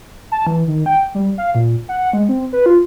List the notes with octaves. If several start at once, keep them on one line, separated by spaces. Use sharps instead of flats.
A5
E3
D#3
G5
G3
F5
A#2
F#5
G#3
C4
B4
F4